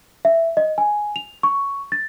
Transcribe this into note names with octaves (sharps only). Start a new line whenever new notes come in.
E5
D#5
G#5
F7
C#6
A6